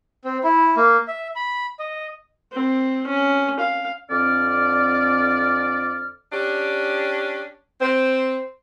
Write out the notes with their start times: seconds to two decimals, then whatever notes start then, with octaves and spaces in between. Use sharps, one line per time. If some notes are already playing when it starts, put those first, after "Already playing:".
0.25 C4
0.44 E4
0.77 A#3
1.08 E5
1.36 B5
1.79 D#5
2.53 C4
3.07 C#4
3.59 F5
4.10 F2 D3 C4 D5 D6 F6
6.33 C#4 D4 G4
7.81 C4 C5